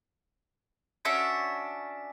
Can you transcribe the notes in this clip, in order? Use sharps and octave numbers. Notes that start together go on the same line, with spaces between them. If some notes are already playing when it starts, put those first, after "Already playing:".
C#4 D4 F#4 E5